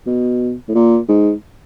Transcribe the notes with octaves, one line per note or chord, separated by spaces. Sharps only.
B2
A2
A#2
G#2